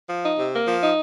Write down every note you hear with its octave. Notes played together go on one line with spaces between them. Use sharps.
F3
D#4
C3
A#3
F3
D#4